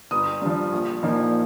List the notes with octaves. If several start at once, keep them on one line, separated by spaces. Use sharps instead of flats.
G1 D#6
G2 F3
A#1
A#2 F3 A#3 D#4